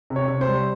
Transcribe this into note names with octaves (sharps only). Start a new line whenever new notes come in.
C3
C#5
C3
C5
G3